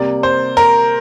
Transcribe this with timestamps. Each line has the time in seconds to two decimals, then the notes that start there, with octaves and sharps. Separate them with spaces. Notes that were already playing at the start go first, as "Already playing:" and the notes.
Already playing: C3 G3 A#3 D5
0.23 C5
0.57 A#4